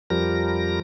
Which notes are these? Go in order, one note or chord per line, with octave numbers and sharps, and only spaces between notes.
F2 F3 G3 A#4 A#6